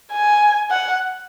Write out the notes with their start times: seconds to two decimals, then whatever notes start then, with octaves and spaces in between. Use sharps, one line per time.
0.12 G#5
0.71 F#5